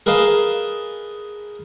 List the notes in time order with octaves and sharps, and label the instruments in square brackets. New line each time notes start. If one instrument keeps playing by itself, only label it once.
[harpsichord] G#4 A#4 B4 D#5 F5 A5